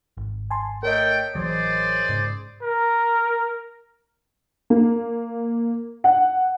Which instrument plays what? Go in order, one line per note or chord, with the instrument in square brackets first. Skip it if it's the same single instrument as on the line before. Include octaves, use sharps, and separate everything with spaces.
[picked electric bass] G#1
[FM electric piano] G#5 A5 C6
[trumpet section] A3 G5 [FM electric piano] A#4 C#5 D#5
[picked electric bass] A1 E3 F#3 [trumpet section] G#4 C5 D5
[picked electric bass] G#2 C#3
[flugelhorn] A#4
[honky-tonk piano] A#3
F#5